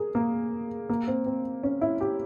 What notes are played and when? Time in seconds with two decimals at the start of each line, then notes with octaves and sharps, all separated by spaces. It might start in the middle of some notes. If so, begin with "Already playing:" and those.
Already playing: G#4 A#4
0.15 A#3
0.89 A#3
1.07 C4
1.26 C4
1.63 C#4
1.81 E4
2.01 G4